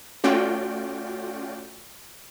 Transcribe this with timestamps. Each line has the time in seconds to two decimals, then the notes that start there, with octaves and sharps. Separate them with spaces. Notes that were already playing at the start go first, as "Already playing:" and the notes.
0.24 A3 C#4 F4 F#4 D5 G5